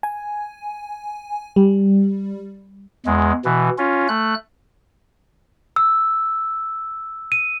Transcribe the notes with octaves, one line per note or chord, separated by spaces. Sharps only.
G#5
G3
E2 G#3
B2 E3
C#4 F4
A3 F#6
E6
D#7